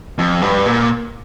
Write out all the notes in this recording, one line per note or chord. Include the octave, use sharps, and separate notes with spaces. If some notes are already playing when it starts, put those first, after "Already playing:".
F2
G2
A#2